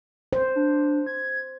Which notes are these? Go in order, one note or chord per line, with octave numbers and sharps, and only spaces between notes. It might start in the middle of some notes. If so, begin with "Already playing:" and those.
C5
D4
G#6